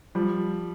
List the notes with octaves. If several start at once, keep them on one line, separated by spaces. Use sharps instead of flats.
F3 G3